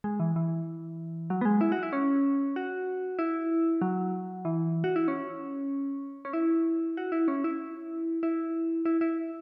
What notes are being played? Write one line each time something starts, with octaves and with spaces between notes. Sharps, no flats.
G#3
E3
E3
F#3
B3
G#3
E4
F#4
E4
C#4
F#4
E4
F#3
E3
F#4
E4
C#4
C#4
E4
F#4
E4
C#4
E4
E4
E4
E4